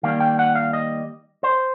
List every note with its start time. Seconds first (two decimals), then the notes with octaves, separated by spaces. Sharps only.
0.03 D#3 G3 A#3 F5
0.20 G5
0.39 F#5
0.55 F5
0.73 D#5
1.43 C5